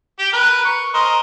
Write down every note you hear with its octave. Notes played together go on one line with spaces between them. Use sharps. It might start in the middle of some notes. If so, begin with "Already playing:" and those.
G4
A#4 B4
C#6
A#4 C5 D#5